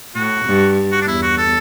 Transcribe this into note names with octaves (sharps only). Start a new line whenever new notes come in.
A2 F#4
G2
F#4
D4
E2 E4
F#4
A4